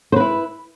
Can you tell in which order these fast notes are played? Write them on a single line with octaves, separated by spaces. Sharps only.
C5 B4 E4